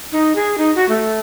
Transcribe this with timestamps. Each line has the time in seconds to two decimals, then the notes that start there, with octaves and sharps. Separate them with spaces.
0.12 D#4
0.36 G#4
0.58 D#4
0.76 F#4
0.89 A3